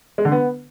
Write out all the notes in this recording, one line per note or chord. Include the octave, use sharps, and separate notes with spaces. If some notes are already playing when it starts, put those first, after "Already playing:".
G#3
D3
B3